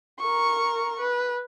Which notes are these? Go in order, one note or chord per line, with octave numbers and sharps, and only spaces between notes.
A#4 C#6
B4